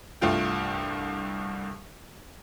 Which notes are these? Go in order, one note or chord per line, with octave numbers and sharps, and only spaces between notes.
C2 G2 A3 F4 G5